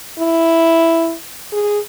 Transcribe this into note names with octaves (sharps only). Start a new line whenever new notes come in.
E4
G#4